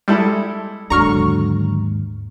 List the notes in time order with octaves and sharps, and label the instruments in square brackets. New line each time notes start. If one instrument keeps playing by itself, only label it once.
[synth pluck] G3 [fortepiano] G#3 E4 A4
[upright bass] D#2 G#2 [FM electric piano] D3 F#3 [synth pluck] A#5 C#6 F6